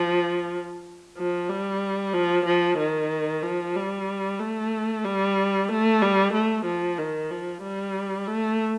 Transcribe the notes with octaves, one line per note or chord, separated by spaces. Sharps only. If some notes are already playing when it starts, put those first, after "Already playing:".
Already playing: F3
F3
G3
F3
F3
D#3
F3
G3
A3
G3
A3
G3
A3
F3
D#3
F3
G3
A3